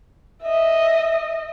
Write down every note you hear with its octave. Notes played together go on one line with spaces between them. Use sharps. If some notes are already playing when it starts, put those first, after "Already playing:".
D#5 E5